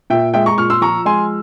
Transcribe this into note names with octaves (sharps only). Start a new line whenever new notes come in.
A#2 E5 G5
G#3 E5 G5
A#5 C#6
A#2 C#6 F6
C6 E6
F3 A#5 C#6
G#3 G#5 C6